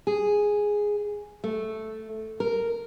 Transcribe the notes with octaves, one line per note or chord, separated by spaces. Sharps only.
G#4
A3
A#4